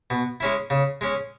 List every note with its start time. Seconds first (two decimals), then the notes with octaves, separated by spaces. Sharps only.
0.10 B2
0.40 G#3 C#4 E4
0.70 C#3
1.01 G#3 C#4